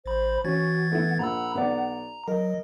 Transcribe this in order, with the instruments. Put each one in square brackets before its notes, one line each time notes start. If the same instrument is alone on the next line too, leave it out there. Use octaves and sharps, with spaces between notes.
[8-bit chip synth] A1 B5 [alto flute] C5
[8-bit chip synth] E3 G#6 A6 [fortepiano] C#4 [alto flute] F#4
[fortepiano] A3 B3 E4 [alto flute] F#5
[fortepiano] A#1 [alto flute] F#5 [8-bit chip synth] A#5 B5 E6
[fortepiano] B1 B3 D5 [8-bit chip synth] A#5
[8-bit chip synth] F#3 [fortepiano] A#4 [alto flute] D#5